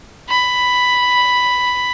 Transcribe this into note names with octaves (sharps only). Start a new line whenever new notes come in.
B5